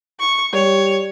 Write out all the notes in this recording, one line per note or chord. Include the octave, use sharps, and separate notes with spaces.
C#6
G3 C#5